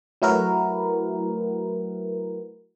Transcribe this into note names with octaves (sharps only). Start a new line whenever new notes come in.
F#3 A3 E4 F#4 A#4 B4